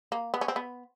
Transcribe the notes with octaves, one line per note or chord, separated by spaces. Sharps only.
A#3
B3
C#4
C4
B3